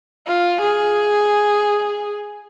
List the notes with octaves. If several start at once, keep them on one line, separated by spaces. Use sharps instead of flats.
F4
G#4